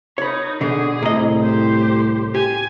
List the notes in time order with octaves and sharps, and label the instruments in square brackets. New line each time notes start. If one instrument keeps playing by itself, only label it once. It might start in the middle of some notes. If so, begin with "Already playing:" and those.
[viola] D#4 A#4 [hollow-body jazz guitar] C#5 B5
[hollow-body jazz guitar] B2 D3 [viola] G#4
[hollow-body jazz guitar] C2 D#5 [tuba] A2
[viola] G4 C5
[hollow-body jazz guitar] G4 [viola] G#5